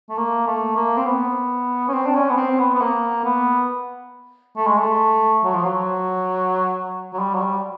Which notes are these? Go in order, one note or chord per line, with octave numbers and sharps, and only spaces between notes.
A3
A#3
A3
A#3
C4
B3
C#4
C4
D4
C#4
B3
C4
B3
B3
A#3
B3
A3
G#3
A3
F#3
F3
F#3
F#3
G3
F#3
G3